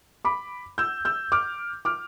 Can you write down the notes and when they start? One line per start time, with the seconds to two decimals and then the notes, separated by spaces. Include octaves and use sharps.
0.25 B5 D6
0.78 E6 G6
1.05 E6 G6
1.32 D6 F6
1.85 D6 F6